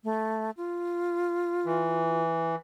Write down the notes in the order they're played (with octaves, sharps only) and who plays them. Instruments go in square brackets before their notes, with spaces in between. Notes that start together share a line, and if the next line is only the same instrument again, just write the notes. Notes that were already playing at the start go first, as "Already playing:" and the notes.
[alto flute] A3
F4
[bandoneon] E3